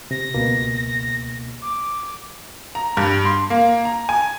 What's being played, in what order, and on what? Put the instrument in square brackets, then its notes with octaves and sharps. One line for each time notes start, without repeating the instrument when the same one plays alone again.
[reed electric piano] C3 [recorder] A#6
[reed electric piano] C#2 B2 A#3
[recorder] D6
[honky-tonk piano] A#5
G2
C6
A#3
A#5
G#5